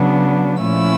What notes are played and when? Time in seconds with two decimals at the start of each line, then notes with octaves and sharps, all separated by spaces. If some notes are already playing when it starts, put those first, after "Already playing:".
Already playing: C#3 F#3 B3 D4
0.61 A#2 F3 A3 C#4 E4 E6